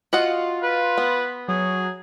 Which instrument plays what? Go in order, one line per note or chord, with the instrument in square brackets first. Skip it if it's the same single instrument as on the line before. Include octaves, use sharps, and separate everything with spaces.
[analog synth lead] F4 [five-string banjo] F#4 D#5 F#5
[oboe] B4
[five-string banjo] B3
[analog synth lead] F#3 [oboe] G#4